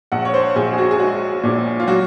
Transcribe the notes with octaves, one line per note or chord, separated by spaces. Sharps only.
A#1 F#5
C#5
C5
A#1 G#4
G#4
F#4
G#4
G#3 F#4
A#2
F4
F#3 F#4